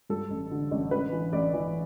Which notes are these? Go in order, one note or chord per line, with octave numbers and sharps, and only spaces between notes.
G2 A4
A1
D3
A1
A1 B4
E3
A1 D5
E3